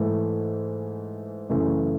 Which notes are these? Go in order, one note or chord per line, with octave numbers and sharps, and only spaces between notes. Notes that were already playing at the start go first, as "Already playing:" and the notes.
Already playing: G#2 E3 A3
F#2 C#3 E3 A3